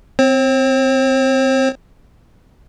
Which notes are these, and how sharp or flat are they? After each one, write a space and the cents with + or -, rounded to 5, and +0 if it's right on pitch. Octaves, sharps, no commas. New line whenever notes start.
C4 -10 C5 +45